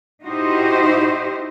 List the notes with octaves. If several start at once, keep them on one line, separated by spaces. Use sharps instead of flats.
D#4 E4 F#4 G4 C5 D#5